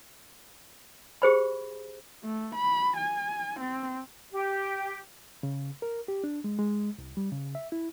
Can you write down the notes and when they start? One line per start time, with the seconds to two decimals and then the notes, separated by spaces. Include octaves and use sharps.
1.22 G4 G#4 C5 B5
2.23 A3
2.55 B5
2.97 G#5
3.60 C4
4.31 G4
5.43 C#3
5.82 A#4
6.08 G4
6.24 D4
6.44 G#3
6.59 G#3
6.98 C2
7.17 G3
7.32 C#3
7.55 E5
7.72 E4